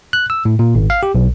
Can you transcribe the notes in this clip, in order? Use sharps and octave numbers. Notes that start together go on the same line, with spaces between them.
F#6
E6
A2
A#2
G#1
F5
G4
B1